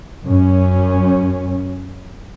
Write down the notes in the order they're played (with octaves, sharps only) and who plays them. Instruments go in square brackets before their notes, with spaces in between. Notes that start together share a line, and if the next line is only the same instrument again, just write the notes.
[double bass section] F#2 C#4